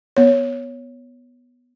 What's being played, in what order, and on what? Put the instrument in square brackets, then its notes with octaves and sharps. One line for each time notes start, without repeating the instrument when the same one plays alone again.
[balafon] B3 C#5